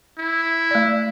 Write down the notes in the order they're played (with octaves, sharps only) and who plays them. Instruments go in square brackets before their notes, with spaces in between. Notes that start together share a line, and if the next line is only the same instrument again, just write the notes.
[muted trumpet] E4
[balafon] A3 D5